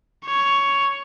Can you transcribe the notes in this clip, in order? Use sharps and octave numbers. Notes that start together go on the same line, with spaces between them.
C#5